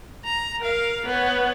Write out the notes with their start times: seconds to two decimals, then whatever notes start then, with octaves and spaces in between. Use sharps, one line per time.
0.25 A#5
0.61 A#4 F5
1.05 B3 C#5